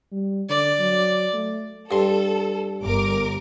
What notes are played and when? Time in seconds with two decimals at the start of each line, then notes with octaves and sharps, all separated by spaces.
0.11 G3
0.49 D3 D5
0.79 F#3
1.33 A3
1.91 G2 A4 C6
2.82 G1 A#4 D6